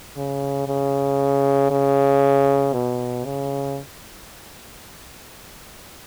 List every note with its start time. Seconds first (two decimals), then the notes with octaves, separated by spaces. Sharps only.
0.17 C#3
0.68 C#3
1.70 C#3
2.73 B2
3.25 C#3